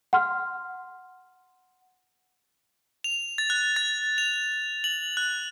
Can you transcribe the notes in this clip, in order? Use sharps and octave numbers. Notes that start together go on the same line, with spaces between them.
F#5 C6 F6
F7
A6
F#6
A6
F7
F#7
F#6